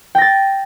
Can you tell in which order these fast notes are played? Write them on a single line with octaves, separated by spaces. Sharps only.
G5 A#6 A6